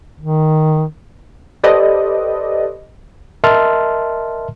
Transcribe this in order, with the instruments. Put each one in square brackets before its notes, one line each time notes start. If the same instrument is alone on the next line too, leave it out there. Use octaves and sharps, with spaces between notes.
[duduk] D#3
[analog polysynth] G4 A4 B4 C5 D5 D#5
[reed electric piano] A#4 D#5 E5 A5 C6 F6